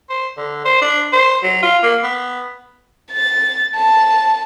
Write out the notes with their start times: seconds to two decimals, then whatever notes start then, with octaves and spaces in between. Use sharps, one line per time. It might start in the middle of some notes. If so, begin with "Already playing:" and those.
0.09 C5
0.37 D3
0.65 C5
0.81 D4
1.13 C5
1.43 F#3
1.62 F4
1.83 A#3
2.03 B3
3.12 A6
3.75 A5